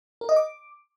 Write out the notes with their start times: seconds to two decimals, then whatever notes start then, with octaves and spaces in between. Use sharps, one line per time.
0.21 A#4
0.29 D#5
0.36 D6